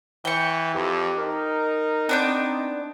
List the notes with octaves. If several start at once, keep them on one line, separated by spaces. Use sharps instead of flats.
E3 G5 C#6
F2 G4
D#4 A#4
B3 C4 D4 G6